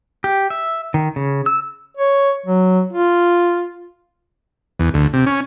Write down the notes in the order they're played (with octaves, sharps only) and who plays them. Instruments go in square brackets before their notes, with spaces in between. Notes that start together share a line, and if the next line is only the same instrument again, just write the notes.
[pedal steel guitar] G4
E5
D#3
C#3
E6
[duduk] C#5
F#3
F4
[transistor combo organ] E2
D2
C3
C#4